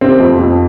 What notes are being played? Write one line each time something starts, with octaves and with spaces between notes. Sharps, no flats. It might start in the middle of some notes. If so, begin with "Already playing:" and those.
C3 C4
F2
F2